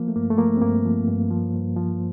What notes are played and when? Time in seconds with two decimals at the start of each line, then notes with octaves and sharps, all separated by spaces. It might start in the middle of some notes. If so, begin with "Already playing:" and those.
Already playing: F3 A#3
0.08 A3
0.16 G2 A#3
0.30 A3
0.38 F3 A#3
0.57 C4
0.62 G2 A#3
0.85 F3
1.08 G2
1.31 F3
1.53 G2
1.76 F3